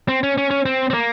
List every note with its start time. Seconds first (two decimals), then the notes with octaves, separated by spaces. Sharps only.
0.08 C4
0.23 C#4
0.38 C#4
0.51 C#4
0.65 C4
0.90 C4
0.94 A#3